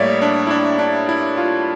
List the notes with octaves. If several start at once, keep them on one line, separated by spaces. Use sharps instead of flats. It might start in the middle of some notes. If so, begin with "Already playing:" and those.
Already playing: A2 G3 A#3 C#5 D5 E5
D4
E4
D4
D4
E4
F4